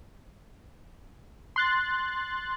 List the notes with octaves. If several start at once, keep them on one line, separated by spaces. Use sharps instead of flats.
C6 F#6 A6